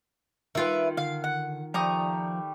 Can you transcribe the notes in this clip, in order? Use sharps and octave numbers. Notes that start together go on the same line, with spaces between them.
D#3 F4 B4 E5
D3 F5
F#5
F3 G3 A3 D5 A#5 C#6 D#6